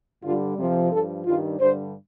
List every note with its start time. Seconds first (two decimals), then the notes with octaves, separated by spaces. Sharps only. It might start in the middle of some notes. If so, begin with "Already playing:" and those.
0.24 G2 D3 G3 F4
0.58 F2 C3 F3
0.92 G2 F3 A4
1.26 G2 D#3 G3 F4
1.60 G2 D3 G3 C5